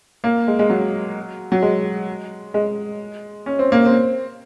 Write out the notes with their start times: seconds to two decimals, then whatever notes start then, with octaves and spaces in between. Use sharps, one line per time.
0.24 A#3
0.48 G#3
0.59 G#3
0.70 F#3
1.52 F#3
1.62 G#3
2.54 G#3
3.46 C#4
3.59 C4
3.72 A#3
3.85 C4